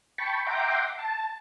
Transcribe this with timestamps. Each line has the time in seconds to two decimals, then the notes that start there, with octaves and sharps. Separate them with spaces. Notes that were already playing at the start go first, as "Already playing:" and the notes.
0.18 G5 A5 B5 C#6
0.46 E5 F#5 G5 A#5 C6 D6
0.99 A5